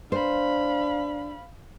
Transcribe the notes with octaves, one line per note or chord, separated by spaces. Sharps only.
D4 C5 F5 B5